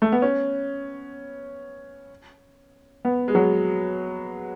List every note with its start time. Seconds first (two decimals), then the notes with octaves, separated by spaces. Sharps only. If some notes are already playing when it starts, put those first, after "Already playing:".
0.02 A3
0.12 B3
0.22 C#4
3.05 B3
3.28 G#3
3.35 F#3